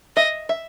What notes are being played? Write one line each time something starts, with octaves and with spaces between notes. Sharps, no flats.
D#5 E5
E5